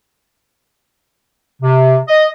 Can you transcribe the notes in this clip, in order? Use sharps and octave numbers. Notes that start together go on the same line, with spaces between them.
C3
D#5